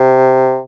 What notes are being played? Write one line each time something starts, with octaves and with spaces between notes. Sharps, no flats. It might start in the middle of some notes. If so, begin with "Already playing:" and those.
Already playing: C3